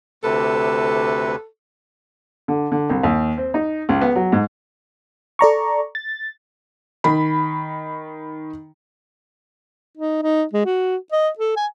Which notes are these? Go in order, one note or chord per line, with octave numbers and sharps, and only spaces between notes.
D2 C3 A4 B4
D3
D3
C2
D#2
C4
D#4
C#2
B3
F#3
G#2
A4 D5 A#5 C#6
A6
D#3 B5
D#4
D#4
G#3
F#4
D#5
A4
G#5